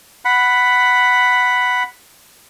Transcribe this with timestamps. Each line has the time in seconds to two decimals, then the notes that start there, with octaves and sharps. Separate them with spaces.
0.25 F#5 B5